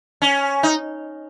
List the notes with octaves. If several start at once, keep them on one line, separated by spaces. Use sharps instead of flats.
C#4
D#4